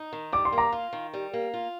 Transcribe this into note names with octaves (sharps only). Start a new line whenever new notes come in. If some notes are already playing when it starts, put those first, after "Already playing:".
Already playing: D#4
D#3
G3 D6
C6
A#3
A#5 D6
F4
D#3
G3
A#3
F4